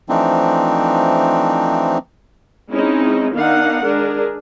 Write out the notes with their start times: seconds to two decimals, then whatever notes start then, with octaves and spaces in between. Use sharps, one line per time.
0.09 E3 F3 A3 C4 D4 D#4
2.72 G#3 C4 C#4 D#4 E4
3.33 D#3 B3 D4 D#4 F5 F#5
3.85 G#3 D4 G#4 A#4